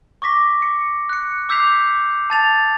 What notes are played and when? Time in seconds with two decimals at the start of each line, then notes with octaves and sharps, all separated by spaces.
0.22 C#6 D6 A#6 B6
0.62 C#7
1.09 F#6 C#7
1.49 D6 E6 G6 B6 C7 F7
2.30 A5 A6 F7